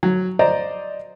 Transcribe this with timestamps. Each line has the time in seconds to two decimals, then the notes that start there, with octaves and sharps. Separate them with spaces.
0.03 F#3
0.39 C5 D5 D#5 A#5